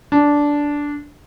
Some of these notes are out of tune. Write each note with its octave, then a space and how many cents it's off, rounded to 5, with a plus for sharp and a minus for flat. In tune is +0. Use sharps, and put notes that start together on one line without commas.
D4 -10